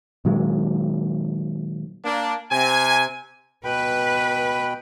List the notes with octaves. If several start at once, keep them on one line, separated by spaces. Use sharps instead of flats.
A#2 D#3 F#3 G#3
A#3 D4
C3 G#5
B2 B4 G5 B5